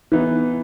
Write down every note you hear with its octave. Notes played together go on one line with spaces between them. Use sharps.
E3 B3 D#4